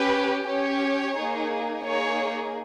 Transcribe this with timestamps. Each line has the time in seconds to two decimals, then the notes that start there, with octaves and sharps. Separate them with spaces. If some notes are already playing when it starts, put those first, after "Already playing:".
Already playing: C#4 G4 B4
0.48 C#4 G4 C#5
1.16 A#3 D#4 G#4
1.84 A#3 D#4 G#4 C#5